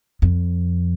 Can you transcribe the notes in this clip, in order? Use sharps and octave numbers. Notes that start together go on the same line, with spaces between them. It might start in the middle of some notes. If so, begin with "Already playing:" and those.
F2